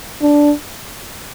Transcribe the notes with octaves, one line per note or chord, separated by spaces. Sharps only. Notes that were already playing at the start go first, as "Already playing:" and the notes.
D4